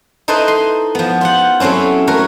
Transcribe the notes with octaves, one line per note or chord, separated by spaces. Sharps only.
D#4 E4 A4 B4 C5 D#5
C6
F3 B3
F4 G4 F#5
F#3 A3 C4 C#4 E4
A3 A#4 B4 C#5